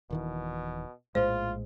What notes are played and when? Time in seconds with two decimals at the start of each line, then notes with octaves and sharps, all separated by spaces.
0.10 D#1 B2 D#3 E3
1.15 A#1 A2 G#3 F4 C5